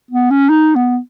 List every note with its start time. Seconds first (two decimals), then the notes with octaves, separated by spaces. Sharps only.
0.11 B3
0.30 C#4
0.50 D#4
0.75 B3